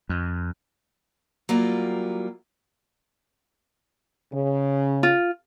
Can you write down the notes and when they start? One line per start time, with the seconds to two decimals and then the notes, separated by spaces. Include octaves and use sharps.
0.09 F2
1.49 F#3 G3 A#3 E4 F4
4.33 C#3
5.03 F4